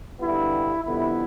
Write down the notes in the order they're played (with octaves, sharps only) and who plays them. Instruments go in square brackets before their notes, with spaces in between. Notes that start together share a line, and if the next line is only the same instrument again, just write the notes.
[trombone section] G2 D3 G3 B3 E4
F2 D3 G3 B3 E4